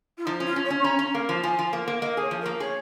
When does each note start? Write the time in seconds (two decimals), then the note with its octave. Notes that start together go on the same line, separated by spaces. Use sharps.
0.17 F4
0.25 F3 D#4
0.40 C#4
0.46 F4
0.56 C#4
0.65 C#5
0.70 C#4
0.80 C#6
0.84 C#4 A#5
0.99 C#4
1.14 A#3
1.29 F3
1.43 F3 G#5
1.59 F3
1.73 A#3
1.88 A#3
2.01 A#3 D#5
2.17 G#4 C#5
2.31 F3
2.42 A#4
2.46 A#3
2.60 G#4 C#5